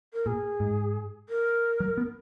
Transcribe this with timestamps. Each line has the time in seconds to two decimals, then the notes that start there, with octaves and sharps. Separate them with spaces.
0.13 A#4
0.26 A#2 G#4
0.60 G#2
1.29 A#4
1.80 F#3
1.97 B3